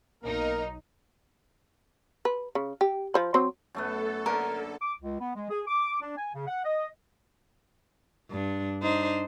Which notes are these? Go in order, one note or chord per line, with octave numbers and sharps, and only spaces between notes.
B1 A#3 D#4 A#4
B4
C#3
G4
F3 C5 B5
F#3 C4 C5
F#2 A3 B3 A4
D3 A#3 A#4 B4
D6
C#2
B3
G#3
G#4
D6
D4
G#5
C#3
F#5
D#5
G2 D4
D4 D#4 C5